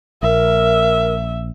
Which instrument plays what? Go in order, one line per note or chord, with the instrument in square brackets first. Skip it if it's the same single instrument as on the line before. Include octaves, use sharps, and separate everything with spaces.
[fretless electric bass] A#1 [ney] A#4 [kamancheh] E5